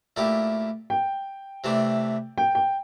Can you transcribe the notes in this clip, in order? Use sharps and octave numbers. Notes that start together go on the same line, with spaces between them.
A#2 A3 E4 G4
G5
C3 E3 A3 D4
G5
G5